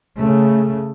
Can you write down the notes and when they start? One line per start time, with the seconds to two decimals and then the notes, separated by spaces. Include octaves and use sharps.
0.21 C#3 A3